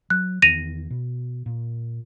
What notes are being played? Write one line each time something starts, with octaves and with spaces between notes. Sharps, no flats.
F#3 F#6
E2 D#3 A#6 D#7 F7
B2
A#2